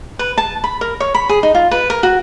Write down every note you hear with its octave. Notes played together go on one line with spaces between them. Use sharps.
B4
A5
B5
A#4
C#5
B5
G#4
D#4
F4
B4
A#4
F#4